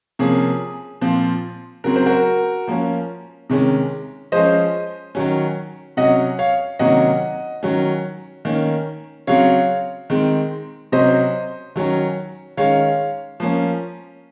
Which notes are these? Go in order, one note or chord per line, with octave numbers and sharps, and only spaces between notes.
C3 F3 A#3 C#4 G#4
A#2 F3 C4
C#3 F#3 C4 A#4
C5
F#4 A#4
F3 A#3 C#4
C3 D#3 G#3 C#4
F3 G#3 C#4 C5 D#5
D#3 F#3 C#4
C3 F#3 C#4 D#5 F#5
C#5 F5
C3 D#3 F#3 A#3 C#4 D#5 F#5
D#3 F#3 C#4
D#3 A#3 C#4
C#3 F#3 C4 C#5 F5
D#3 G#3 C4
C3 F#3 C#4 C5 D#5
D#3 F#3 C#4
D#3 G#3 C#4 C#5 F5
F3 A#3 C#4